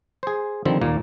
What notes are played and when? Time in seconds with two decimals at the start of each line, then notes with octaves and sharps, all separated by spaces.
0.23 G#4 C5
0.65 D3 D#3 F3 G3 C4
0.81 D#2 A#2 A#3